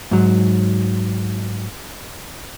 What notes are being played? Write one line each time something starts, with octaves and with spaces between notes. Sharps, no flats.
G#2 F#3